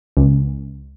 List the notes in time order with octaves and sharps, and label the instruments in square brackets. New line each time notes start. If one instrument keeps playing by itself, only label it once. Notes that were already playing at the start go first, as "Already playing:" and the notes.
[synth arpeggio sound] C#2